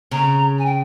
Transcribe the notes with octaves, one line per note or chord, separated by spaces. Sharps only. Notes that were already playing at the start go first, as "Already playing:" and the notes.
C#3 A#5
G#5
G5